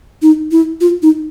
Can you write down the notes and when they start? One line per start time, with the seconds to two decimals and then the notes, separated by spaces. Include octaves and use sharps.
0.22 D#4
0.51 E4
0.81 F4
1.03 D#4